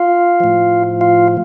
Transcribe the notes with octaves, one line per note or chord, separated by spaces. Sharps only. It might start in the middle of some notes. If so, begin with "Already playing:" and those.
Already playing: F4 F5
A2 F3
F4 F5